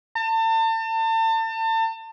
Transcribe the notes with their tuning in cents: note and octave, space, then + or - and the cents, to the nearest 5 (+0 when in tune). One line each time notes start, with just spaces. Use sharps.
A5 +35